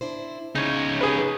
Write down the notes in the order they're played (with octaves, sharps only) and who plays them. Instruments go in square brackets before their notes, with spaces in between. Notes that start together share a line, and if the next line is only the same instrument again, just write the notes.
[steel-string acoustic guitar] D4 E4 C5
[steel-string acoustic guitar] C#3 [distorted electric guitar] D#4 C#5
[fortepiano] G#4 B4